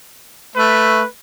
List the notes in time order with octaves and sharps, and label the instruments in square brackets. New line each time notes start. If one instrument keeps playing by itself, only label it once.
[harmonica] A3 [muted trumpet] B4